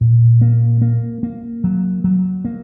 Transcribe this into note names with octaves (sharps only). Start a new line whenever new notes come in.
A#2
A#3
A#3
A#3
F#3
F#3
A#3